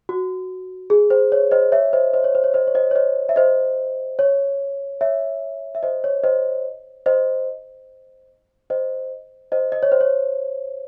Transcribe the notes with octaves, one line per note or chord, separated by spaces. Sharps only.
F#4
G#4
C5
C#5
C5 D#5
C#5 E5
C5 D#5
C5 D#5
C#5
C5
C#5
C5 D#5
C#5
C5 D#5
C#5
C5 D#5
E5
C5 D#5
C#5
C#5 E5
E5
C5 D#5
C#5
C5 D#5
C5 D#5
C5 D#5
C5 D#5
D#5
C#5
C5
C#5